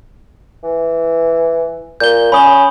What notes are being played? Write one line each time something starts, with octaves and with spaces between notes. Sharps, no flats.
E3
A#2 G6 G7
C#4 B5 D#6 G7